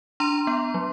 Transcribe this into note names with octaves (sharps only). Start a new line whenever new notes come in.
D4 A#5 C6
B3
F#3